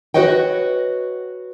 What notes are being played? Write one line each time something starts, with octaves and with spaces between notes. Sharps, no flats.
F#4 G4 B4 C#5 D#5 G5